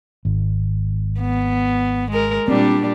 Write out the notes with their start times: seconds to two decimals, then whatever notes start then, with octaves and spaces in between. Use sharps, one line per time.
0.25 G#1
1.20 B3
2.11 G#3 A#4
2.48 A#2 G3 C4 D4